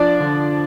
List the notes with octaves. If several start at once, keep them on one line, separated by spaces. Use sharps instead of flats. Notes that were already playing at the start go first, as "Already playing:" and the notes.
Already playing: F3 D4 D5
D3